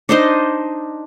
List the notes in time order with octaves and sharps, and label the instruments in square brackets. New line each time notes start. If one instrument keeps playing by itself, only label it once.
[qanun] D4 D#4 C5 D#5